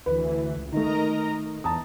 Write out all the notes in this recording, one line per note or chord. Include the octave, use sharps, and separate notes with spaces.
D2 E3 B4
C#2
D#3 A3 A#4 D#5 A#5
E2 A5 A#5 D#6